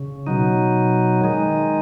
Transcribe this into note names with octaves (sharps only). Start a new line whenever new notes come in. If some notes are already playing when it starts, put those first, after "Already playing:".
Already playing: C#3
B2 F#3 D#4
D#3 G#3 D#4